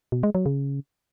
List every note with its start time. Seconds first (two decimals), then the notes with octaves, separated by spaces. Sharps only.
0.12 B2
0.23 G#3
0.35 F#3
0.46 C#3